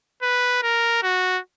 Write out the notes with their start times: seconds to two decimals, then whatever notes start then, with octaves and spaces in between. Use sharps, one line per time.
0.22 B4
0.63 A#4
1.03 F#4